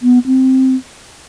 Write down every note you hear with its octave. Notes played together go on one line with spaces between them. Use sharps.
B3
C4